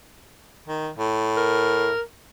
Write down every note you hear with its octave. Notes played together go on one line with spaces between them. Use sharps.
D#3
A2
A#4